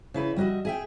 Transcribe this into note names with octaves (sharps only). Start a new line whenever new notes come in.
C#3 E4 B4
G3 B3 F#4 D#5 E5
G#4 E5 G5